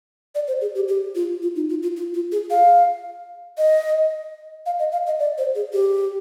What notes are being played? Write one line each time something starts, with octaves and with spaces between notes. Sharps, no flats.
D5
C5
G#4
G4
G4
F4
F4
D#4
F4
F4
F4
F4
G#4
F5
D#5
F5
D#5
F5
D#5
D5
C5
G#4
G4